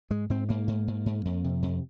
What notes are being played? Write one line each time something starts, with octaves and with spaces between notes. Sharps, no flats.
G#2 G#3
G#2 C4
G#2 A#3
G#2
G#2
G#2
F2
C3
F2